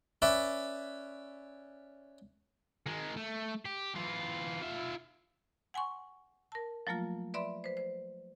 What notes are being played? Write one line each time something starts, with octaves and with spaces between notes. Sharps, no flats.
C#4 B4 D5 E5
D#3 G#3
A3
G4
E3 F4
F4 E5
F#5 G#5 C6 C#6
A#4 A5
F3 F#3 A3 A#3 F4
B4 D5 E5 B5 C6
B4 C5
C5